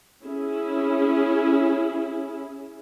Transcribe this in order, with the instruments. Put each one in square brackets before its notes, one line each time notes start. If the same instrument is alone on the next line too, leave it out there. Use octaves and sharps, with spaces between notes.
[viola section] C#4 E4 G#4